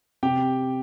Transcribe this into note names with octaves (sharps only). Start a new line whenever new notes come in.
C3 G4 G5